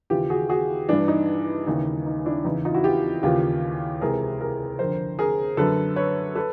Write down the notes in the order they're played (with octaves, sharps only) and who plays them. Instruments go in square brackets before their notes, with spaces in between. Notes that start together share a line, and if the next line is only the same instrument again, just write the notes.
[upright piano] D#2 C#3 E3 F4 G4
F#4 G#4
F#4 G#4
G2 E3 D4
D#4
D#2 C#3 E3 D#4
D#4
D4 E4
E2 C#3 E3 D#4
D#4 F4
E4 F#4
F4 G4
D#2 C#3 E3 F4 G4
C#2 C3 E3 G#4 A#4
G#4 A#4
F2 D3 A#4 C5
G#4 A#4
F#2 D3 A4 B4
B4 C#5
A4 B4